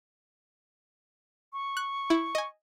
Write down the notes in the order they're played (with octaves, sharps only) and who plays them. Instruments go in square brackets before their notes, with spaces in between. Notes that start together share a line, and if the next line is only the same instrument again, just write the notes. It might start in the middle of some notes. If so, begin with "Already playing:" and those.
[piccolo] C#6
[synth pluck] F#6
E4
D#5 G#5